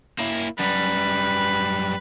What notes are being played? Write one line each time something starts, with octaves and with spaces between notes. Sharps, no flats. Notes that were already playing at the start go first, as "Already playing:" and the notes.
A#3 E4
F#2 G3 B4